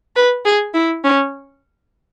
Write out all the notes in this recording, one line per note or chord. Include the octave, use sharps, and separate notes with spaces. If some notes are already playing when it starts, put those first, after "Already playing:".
B4
G#4
E4
C#4